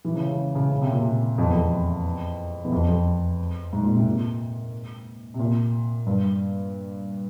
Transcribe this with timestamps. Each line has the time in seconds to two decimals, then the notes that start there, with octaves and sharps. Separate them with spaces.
0.05 E3
0.16 C#3
0.27 C#3
0.55 C#3
0.72 C#3
0.82 C3
0.91 A#2
1.00 C3
1.38 F2
1.46 E2
1.53 F2
2.64 E2
2.72 F2
2.88 F2
3.73 G#2
3.83 A#2
3.94 C3
4.06 A#2
5.34 C3
5.39 A#2
6.06 G2